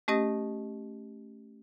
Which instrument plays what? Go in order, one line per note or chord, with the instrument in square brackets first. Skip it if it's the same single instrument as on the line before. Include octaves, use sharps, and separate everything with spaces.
[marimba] A3 C#4 G4 D#5 D#6 A#6